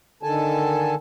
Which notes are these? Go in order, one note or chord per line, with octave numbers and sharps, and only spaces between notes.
D3 D#3 A4 G#5 A5